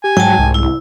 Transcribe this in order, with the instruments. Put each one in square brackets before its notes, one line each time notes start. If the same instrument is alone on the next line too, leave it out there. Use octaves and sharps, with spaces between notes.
[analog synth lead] G4 [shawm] G#5
[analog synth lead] G#2 [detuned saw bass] F#3 [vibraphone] G5 A5
[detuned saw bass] C2
[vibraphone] E4